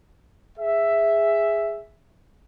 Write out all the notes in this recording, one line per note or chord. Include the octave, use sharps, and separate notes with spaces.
G#4 E5